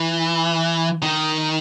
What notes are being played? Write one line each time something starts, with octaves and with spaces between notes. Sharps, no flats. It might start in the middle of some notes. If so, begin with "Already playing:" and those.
Already playing: E3
D#3